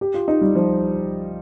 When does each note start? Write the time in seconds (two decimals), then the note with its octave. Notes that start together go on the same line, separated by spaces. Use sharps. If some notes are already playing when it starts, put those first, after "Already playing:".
0.01 G4
0.14 F4
0.28 D#4
0.41 G3
0.55 F3